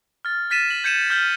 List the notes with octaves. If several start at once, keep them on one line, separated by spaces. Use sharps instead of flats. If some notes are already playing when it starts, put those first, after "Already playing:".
F6 A6
F6 A6 B6 D#7 E7
F#7
G6 G#6 C#7 D#7 E7
F6 G6 B6 F#7 G7